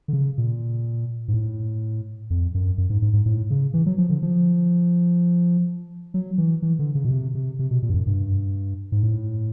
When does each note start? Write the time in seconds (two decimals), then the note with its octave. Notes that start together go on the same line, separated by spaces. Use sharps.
0.08 D3
0.13 C#3
0.38 A#2
1.28 G#2
1.34 A2
2.30 F2
2.54 F#2
2.78 F#2
2.90 G#2
3.02 G#2
3.13 G#2
3.26 A2
3.50 C#3
3.74 E3
3.86 F#3
3.98 F3
4.09 D3
4.22 F3
6.14 F#3
6.38 E3
6.62 E3
6.79 D3
6.95 C#3
7.05 B2
7.11 C3
7.35 C3
7.59 C3
7.71 B2
7.83 A#2
7.90 G2
7.94 F#2
8.06 G2
8.92 G#2
9.03 A2